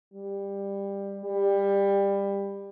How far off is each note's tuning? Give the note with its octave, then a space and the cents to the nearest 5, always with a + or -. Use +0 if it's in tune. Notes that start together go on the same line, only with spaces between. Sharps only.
G3 +15
G3 +20